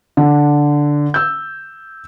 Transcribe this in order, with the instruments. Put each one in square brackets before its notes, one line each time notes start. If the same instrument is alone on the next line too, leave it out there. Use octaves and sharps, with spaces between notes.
[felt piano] D3
E6 G6